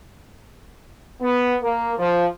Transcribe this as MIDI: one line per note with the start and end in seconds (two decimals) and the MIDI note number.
1.22 1.56 59
1.63 1.93 58
1.98 2.26 53